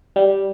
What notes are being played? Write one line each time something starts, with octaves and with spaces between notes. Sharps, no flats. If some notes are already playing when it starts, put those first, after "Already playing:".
G3